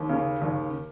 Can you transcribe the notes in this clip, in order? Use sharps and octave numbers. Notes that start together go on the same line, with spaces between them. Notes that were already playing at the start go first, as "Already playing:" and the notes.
Already playing: D#2
C#3
D#2